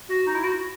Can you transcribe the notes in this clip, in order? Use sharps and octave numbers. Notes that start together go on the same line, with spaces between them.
F#4
D#4
E4
F#4